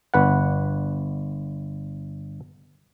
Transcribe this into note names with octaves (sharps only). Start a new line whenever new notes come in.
G1 B4 F#5